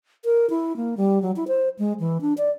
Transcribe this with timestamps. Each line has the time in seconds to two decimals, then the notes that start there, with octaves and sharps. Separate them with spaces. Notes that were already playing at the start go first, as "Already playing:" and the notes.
0.25 A#4
0.50 E4
0.76 A#3
0.97 G3
1.22 F#3
1.36 E4
1.48 C5
1.79 G#3
2.00 E3
2.21 D4
2.38 D5